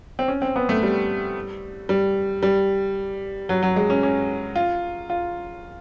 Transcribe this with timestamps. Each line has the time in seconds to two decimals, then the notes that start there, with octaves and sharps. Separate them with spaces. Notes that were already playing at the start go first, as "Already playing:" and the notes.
0.19 C4
0.28 C#4
0.42 C4
0.56 B3
0.69 A3
0.83 G3
1.89 G3
2.43 G3
3.49 F#3
3.63 F#3
3.76 G#3
3.90 C#4
4.03 C#4
4.56 F4
5.10 F4